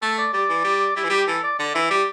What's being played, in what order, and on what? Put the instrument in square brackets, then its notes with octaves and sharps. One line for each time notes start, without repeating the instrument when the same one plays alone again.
[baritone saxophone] A3 [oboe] A4
[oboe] D5
[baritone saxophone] G3 [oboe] D5
[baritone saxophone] E3
G3
[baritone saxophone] G3 [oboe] E4
[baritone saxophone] E3
[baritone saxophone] G3 [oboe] G4
[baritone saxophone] E3 [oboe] A4
[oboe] D5
[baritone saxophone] D3 [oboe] D5
[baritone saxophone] E3 [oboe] E5
[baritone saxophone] G3 [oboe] D5